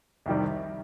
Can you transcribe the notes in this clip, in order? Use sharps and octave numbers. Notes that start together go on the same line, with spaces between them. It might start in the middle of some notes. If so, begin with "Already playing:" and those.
C2 C3 D#3 G3